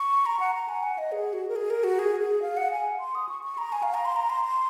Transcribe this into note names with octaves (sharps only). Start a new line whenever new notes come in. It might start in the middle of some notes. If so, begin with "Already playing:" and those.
Already playing: C#6
A#5
F#5
A#5
G#5
F#5
D#5
G#4
F#4
A#4
G#4
A#4
F#4
G#4
G#4
F5
F#5
G#5
C6
D#6
C#6
C#6
A#5
G#5
F5
A#5
C6
A#5
C6
C6